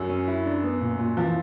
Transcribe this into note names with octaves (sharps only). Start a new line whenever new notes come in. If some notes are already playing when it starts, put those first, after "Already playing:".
Already playing: F#2 F#3
C#4
E4
D4
B3
A#2
A#2
E3 F3